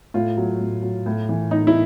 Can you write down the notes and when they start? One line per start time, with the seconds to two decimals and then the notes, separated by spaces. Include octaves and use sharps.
0.14 A2 F4
0.37 F#3
0.60 A2
0.82 F#3
1.06 A2
1.29 E3
1.51 A2 D#4
1.67 E4